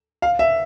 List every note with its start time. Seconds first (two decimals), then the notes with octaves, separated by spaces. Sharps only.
0.22 F5
0.39 E5